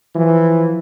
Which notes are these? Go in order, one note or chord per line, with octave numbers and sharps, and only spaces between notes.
E3 F3